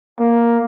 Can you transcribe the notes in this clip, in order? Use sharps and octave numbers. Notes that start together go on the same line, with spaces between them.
A#3